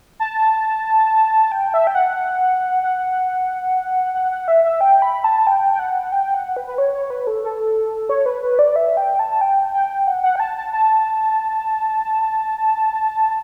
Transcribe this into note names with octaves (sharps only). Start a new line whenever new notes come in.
A5
G5
E5
G5
F#5
F#5
F#5
F#5
E5
E5
G5
B5
A5
G5
G5
F#5
G5
F#5
B4
B4
C#5
C#5
B4
A4
A4
C#5
B4
B4
D5
E5
G5
A5
A5
G5
G5
F#5
F#5
G5
A5
A5
A5